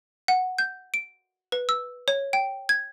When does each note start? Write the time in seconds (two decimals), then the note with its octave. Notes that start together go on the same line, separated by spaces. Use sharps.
0.28 F#5
0.58 G6
0.94 D7
1.52 B4
1.69 E6
2.08 C#5
2.33 G5
2.69 G#6